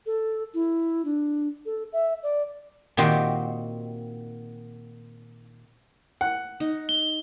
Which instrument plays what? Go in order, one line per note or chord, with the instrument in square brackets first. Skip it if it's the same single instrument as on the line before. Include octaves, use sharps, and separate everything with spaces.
[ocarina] A4
E4
D4
A4
E5
D5
[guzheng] A#2 D#3 C4 F#4 G4 D#5
[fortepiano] F#5
[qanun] D#4
[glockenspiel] G7